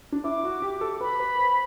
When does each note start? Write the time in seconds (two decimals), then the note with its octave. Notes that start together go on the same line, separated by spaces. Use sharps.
0.12 D4
0.24 E4 D6
0.44 F#4
0.62 G4
0.81 A4
1.01 B4 B5
1.19 B4
1.38 C5